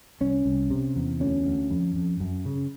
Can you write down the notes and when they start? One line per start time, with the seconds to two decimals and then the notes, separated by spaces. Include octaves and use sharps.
0.21 C2 C#4
0.46 C2
0.70 C3
0.96 E2
1.20 D2 C#4
1.45 D2
1.71 F2
1.96 F2
2.20 F#2
2.45 C#3